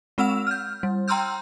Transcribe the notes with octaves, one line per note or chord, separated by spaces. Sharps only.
G#3 C4 F#5 E6 E7 F7
F6 G6
G3
G5 A#5 C6 E6 F6 G6